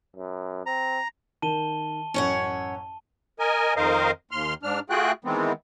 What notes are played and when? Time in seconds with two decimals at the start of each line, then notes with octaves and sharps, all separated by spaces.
0.16 F#2
0.66 C4 A#5
1.42 D#3 A5 D#7 G7
2.14 A1 F#2 C#4 C#5 F#5
3.39 A#4 D#5 G#5
3.76 F2 D#3 A#4 C5 D#5 F5
4.31 D#2 C6 F6
4.63 G#2 D4 F6
4.90 A3 F4 F#4 G#4 G5 F#6
5.25 D#3 E3 G#3 B3 C4